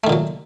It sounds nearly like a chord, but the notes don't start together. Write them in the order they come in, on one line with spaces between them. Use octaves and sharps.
A3 D#3 A#2 F#3